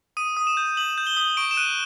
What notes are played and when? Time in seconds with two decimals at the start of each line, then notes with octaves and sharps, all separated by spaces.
0.17 D#6 D#7
0.37 D#6
0.47 E7
0.57 G6
0.77 D#6 F#7
0.98 G6
1.07 G7
1.17 D#6
1.37 C#6 D7
1.51 E7
1.57 F#6 D#7